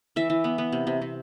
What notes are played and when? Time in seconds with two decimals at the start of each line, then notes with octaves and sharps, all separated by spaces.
0.16 E3 E5
0.30 E3
0.44 B3
0.58 B3
0.72 C3
0.87 C3
1.02 C3